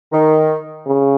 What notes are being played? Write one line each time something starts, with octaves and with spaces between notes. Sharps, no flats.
D#3
C#3